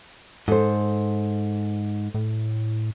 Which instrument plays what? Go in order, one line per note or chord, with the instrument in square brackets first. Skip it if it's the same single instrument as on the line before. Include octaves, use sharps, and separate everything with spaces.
[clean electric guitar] G#2 [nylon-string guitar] A4 C5
[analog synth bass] A2